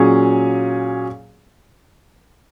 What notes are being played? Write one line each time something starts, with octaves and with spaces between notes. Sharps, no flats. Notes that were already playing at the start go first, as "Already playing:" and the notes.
Already playing: A#2 F#3 C#4 G#4